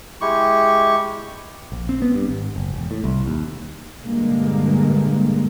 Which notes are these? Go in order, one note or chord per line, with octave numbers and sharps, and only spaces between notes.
G#3 E4 G4 C#6
A#1
C4
B3
G2
G#1
F#1
E1
A2
C2
D#2
G2 A#2 D3 G#3 A#3